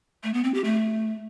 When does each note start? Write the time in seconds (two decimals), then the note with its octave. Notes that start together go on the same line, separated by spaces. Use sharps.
0.24 A3
0.34 B3
0.44 C4
0.54 G4
0.65 A3